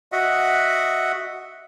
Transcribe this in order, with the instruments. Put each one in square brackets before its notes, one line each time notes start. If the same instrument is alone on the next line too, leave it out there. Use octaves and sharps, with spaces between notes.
[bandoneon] F#4 D#5 E5 F#5